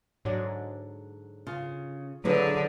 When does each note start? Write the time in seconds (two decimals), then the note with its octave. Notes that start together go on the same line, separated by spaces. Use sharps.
0.25 G#2 D3 F#3 D4
1.47 C#3 F4
2.25 A2 D3 F#3 E4 F4 G#4 B4